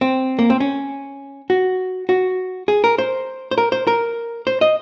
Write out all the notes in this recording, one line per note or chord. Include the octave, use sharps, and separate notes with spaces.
C4
A#3
C4
C#4
F#4
F#4
G#4
A#4
C5
C5
A#4
C5
A#4
C5
D#5